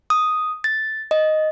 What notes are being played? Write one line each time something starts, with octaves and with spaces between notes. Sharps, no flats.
D#6
A6
D#5